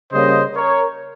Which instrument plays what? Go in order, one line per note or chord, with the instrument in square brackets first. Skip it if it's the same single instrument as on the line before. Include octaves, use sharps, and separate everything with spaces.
[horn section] C#3 G3 A#3 C#4 C5 D#5
A#4 C#5